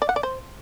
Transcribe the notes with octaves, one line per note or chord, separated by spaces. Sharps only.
D5
F#5
D5
C5